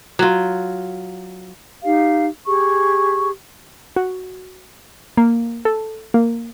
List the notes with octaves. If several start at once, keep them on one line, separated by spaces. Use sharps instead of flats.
F#3 F4
D#4 G4 F5
G4 G#4 C#6
F#4
A#3
A4
A#3